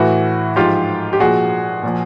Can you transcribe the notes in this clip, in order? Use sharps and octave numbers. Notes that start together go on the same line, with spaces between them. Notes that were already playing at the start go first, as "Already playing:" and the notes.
Already playing: A2 E3 E4 F#4
G#2 F3 F4 G4
G4
A#2 F3 F#4 G#4
A#2 F3